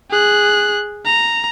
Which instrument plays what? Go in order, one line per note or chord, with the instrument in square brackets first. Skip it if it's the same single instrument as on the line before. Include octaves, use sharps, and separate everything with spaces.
[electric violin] G#4 F#6
A#5